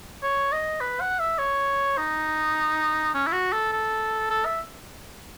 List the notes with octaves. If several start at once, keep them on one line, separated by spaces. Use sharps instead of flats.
C#5
D#5
B4
F#5
E5
C#5
D#4
C#4
E4
F#4
A4
A4
A4
E5